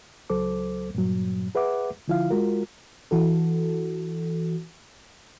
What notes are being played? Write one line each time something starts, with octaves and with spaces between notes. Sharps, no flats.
C#2 F#3 A4 C5 D6
G2 A#2 F#3
G#4 B4 E5 F#5 D6
D3 F3 E4 F4 F5
G#3 F4 F#4 A#4
E3 F#4 A4